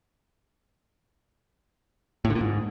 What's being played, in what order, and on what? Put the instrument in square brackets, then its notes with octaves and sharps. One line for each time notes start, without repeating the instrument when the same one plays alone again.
[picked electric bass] A2
D3
A#2
G#2